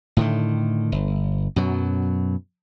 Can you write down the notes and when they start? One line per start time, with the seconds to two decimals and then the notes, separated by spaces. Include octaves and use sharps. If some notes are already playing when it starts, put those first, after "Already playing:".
0.17 A2 D3 D#3
0.92 G1
1.56 F#2 B2 F#3